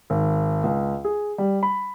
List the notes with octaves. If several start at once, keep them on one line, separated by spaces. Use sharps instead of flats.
G#1
C#2
G#4
G3
B5